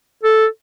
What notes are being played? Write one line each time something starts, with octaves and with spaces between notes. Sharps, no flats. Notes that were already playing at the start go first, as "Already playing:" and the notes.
A4